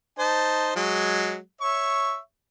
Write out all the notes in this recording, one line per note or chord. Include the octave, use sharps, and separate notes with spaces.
D#4 C5 A5
F#3 G#3
C#5 E5 C#6